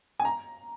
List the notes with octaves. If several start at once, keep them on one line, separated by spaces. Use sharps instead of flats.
G#5
A#5